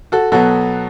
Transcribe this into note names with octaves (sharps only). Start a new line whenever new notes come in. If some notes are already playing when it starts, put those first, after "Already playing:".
F#4 A4
B2 F#3 B3 F#4 A4